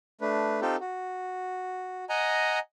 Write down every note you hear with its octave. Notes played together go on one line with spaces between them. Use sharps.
A3 D4 B4
C4 D#4 F4 G4 A4
F#4
D#5 F#5 G#5 A#5